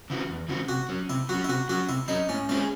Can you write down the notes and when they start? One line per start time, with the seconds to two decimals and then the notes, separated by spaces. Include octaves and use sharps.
0.10 C#3 E3 C4 F#4
0.29 E2
0.49 C#3 E3 C4 F#4
0.69 C3 F#4
0.89 F#3 C#4
1.10 C3 E4
1.29 F#3 C#4 F#4
1.44 E4
1.49 C3 F#4
1.69 F#3 C#4 F#4
1.89 C3 E4
2.08 F#3 C#4 D#4
2.29 A2 C#4
2.49 G#3 C4 C#4 E4
2.54 G#4